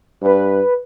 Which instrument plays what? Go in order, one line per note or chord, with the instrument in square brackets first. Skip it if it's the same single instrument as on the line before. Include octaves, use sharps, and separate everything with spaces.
[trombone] G2 [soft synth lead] B4